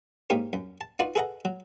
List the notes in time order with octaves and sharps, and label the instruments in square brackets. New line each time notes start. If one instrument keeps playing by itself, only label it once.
[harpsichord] G#2 A#3 D#4 G4 A#4 C#5
F#2
A5
D#4 F4 F#4 B4 D5
G#4 A4 B4 D#5 F#5 A#5
F#3